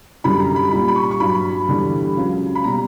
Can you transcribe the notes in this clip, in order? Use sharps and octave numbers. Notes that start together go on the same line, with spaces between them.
F#2 D3 G3 B5
A#5
B5
A#2 G3 B5
B5
C#6
C#6
G2 F#3 B5
E2 D3 G3
C#2 C#3 F#3
B5
B2 G3 A#5